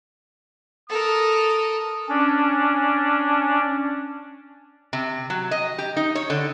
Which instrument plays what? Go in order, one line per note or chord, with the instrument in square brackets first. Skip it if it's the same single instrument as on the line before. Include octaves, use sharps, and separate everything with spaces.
[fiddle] A4 A#4 [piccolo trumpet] D#6
[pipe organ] C#4 D4
[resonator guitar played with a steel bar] C3
F#3
D#5
G4
D#4
C#5
D3